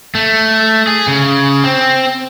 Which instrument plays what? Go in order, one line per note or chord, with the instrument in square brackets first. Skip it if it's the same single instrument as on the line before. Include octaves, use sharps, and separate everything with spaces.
[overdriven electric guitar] A3
G#4
C#3
C4